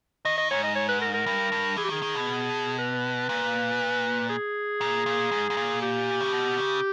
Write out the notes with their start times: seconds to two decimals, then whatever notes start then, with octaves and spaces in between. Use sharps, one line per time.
0.25 D#3 D#5
0.38 D#5
0.51 G#2 C#5
0.63 D#5
0.76 C#5
0.89 B4
1.01 A#4
1.14 A#4
1.26 G2
1.52 G2
1.77 E3 G#4
1.84 G4
1.89 D#3 G#4
2.02 D#3
2.15 B2
2.79 B4
3.29 A#2
4.29 G#4
4.81 A#2
5.06 A#2
5.31 G#2
5.50 G#2
5.57 A#2
5.82 G4
6.21 C#3
6.32 B2
6.58 C#3